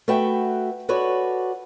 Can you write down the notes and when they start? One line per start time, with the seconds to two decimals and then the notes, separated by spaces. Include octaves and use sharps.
0.08 A3 F#4 B4 E5 G5
0.89 F#4 A4 B4 C#5 D5